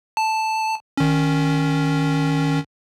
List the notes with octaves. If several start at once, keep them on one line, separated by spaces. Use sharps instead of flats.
A5
D#3 C#4